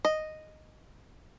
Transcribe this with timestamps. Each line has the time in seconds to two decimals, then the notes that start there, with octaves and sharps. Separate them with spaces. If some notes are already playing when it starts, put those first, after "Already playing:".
0.05 D#5